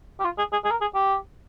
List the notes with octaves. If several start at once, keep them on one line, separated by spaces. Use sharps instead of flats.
G4
F4
G#4
G#4
G#4
A#4
G#4
G4